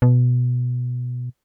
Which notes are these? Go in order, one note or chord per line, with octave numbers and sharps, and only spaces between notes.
B2